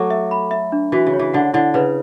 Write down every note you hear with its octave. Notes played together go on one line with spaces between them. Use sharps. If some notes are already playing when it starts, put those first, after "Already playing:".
Already playing: F#3 A3 A4 D6
E5
B5
E5
D4
E3 F#4
C#3
C#5
E3
D3 F#5
D3 E4
C#3 B4